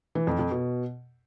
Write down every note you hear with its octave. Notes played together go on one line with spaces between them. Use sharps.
E3
F2
F2
B2